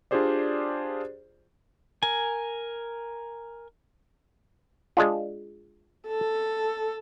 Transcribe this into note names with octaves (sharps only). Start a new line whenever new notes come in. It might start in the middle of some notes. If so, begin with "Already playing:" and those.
D4 F4 G4 G#4 C5 D5
A#4 G#5
G#3 D4 F4
A4